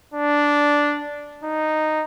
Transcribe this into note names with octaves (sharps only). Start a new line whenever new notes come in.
D4
D#4